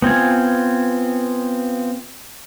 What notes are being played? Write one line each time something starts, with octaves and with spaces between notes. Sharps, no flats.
B3 C4 F4 G#5